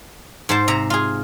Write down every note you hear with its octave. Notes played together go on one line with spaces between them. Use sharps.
G#2 C5 A5
C3 A#5
F4 G#4